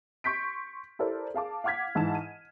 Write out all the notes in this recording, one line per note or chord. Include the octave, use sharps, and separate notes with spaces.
C6 C#6 G6 B6 D7
E4 G4 A4 A#4 C5 D5
G#4 F5 A5 D6
F5 F#5 D6 F6 G#6 B6
G#2 E3 A5 E7
D#7